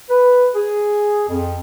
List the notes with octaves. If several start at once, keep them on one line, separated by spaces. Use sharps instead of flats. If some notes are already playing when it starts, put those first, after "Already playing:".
B4
G#4
F2